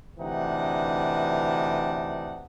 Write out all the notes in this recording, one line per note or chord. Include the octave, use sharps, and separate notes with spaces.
D2 C3 E3 D4 D#4 F#5